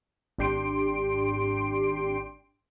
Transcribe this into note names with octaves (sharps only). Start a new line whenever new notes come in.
G#1 D4 G4 C6 D7